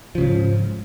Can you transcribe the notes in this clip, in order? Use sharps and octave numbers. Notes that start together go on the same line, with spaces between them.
G#2 C#3 F3